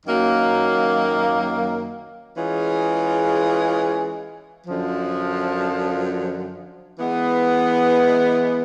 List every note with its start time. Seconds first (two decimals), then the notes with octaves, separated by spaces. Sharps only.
0.06 F#2 D#3 F#3 A#3
2.36 E3 G#3 C#4 F4 G#4
4.67 F#2 D3 F3
6.99 E3 G#3 B3